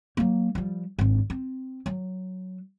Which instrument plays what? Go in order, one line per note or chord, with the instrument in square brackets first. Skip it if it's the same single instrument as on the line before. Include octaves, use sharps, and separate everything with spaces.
[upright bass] F#3 A#3
F3 G3
G#1 D4
C4
F#3